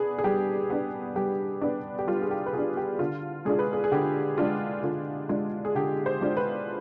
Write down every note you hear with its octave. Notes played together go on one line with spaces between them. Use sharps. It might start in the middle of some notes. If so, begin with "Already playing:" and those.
Already playing: B3 D4 G#4 B4
G#4
G3 G4
B3 D4
G3 G4
B3 D4
G4
G3 F4
G#4
G4
B4
B3 D4 G#4
G4
D3 F4
G#3 D4 F4 G#4
B4
G#4
G#4
D3 G4
G#3 D4 F4
D3 F4
G#3 D4 F4
G#4
D3 G4
C5
G#3 D4 F4
B4